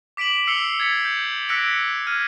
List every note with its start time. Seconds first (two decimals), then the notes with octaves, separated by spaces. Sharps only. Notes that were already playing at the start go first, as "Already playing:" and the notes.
0.17 D6 B6 D7 E7 F#7
0.47 E6 C7 C#7 F7 G7
0.80 G#6 A6 B6 C#7
1.05 G6
1.49 E6 F#6 A#6 B6 C#7 D7
2.07 F6 G#6 D#7